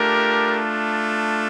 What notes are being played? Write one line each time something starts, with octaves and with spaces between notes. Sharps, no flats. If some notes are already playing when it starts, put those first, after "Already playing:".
Already playing: A3 D4 F4 G4 A#4